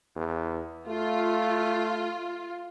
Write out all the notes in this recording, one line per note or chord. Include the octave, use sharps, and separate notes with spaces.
E2
A3 F4